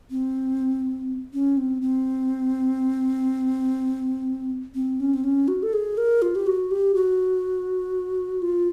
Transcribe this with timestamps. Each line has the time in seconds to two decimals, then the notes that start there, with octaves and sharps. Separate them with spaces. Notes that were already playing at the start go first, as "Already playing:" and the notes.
0.11 C4
1.34 C#4
1.57 C4
1.82 C4
4.75 C4
5.00 C#4
5.14 C4
5.24 C#4
5.48 F#4
5.63 A4
5.73 G#4
5.98 A#4
6.22 F4
6.35 G4
6.47 F#4
6.71 G4
6.95 F#4
8.42 F4